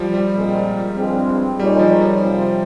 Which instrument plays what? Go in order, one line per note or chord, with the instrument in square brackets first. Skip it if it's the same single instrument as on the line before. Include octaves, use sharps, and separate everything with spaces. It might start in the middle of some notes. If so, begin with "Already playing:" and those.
Already playing: [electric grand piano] F3 G3
G3
[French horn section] A#2 G#3 C4
G2 F3 G#3 C4
[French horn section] A#2 G#3 D#4 A#4 C#5 [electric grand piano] G3
[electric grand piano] F3
G3
[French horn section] C3 F3 C4